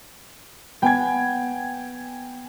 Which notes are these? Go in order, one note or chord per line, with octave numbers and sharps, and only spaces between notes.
B3 G5 G#5 G#6